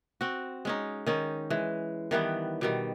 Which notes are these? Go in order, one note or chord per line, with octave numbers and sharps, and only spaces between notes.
C4 F#4
G#3 C#4 D#4
D#3 C#4 D#4
E3 G#3
D#3 E3 G3 B3
B2 D#3 G3